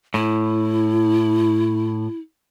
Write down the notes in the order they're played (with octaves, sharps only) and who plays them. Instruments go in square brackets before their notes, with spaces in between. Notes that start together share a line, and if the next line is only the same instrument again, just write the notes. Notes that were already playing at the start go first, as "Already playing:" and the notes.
[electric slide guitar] A2 [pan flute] E4